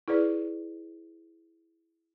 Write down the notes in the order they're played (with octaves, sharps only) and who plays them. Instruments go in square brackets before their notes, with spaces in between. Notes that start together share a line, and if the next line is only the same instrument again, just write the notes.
[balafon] E4 G#4 B4 D5